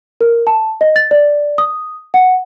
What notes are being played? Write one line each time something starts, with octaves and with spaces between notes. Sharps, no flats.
A#4
A5
D#5
A6
D5
D#6
F#5